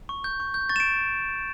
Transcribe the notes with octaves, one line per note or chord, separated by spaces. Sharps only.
C#6
G6
C#6
G6
C#6 A6
E7
D7